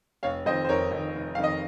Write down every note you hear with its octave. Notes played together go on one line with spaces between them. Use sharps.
F1 C#5 F5
F2 D#3 C5 D#5
C5
F1 A#4 C#5
F2 D#3
F1
F2 D#3 F5
D#5